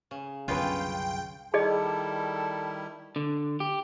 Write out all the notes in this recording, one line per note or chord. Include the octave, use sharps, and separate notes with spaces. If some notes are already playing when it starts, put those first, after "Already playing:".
C#3
C2 F#2 D3 B3 C#4 F4 G5
D#3 G3 E4 G#4 A4 D5 D#5
D3
G4